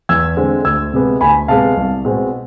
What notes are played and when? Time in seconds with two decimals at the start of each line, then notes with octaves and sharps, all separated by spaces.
0.09 E2 E6 G#6
0.37 D3 G#3 C4
0.65 D2 E6 G#6
0.93 C3 G#3 B3
1.21 D2 G#5 B5
1.48 C3 G#3 B3 F5 A5
1.77 C2
2.05 B2 G#3 C4